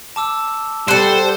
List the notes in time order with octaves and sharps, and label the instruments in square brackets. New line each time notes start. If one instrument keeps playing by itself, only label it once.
[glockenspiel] A5 D6 E6
[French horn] G3 [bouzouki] A4 F#5 [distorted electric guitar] C5